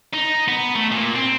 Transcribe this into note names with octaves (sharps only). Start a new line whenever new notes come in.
D#4
B3
A3
A#2
C4